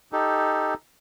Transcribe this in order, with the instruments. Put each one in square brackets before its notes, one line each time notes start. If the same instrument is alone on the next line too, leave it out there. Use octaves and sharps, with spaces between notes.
[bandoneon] D#4 G4 A4